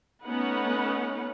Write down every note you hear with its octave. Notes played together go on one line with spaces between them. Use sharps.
A3 B3 C#4 D#4 B4 F#5